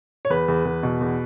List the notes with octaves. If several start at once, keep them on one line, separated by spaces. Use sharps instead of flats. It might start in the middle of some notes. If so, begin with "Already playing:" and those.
C#5
E2 B4
E2
E2
B2
E2